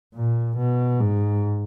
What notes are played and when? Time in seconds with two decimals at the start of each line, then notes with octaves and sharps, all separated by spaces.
0.14 A#2
0.57 B2
1.00 G#2